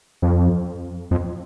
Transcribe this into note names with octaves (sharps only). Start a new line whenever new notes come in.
F2
F2